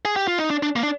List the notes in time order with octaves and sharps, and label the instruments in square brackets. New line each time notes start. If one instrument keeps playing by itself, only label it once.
[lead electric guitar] G#4
G4
F4
D#4
D4
D4
A#3
D4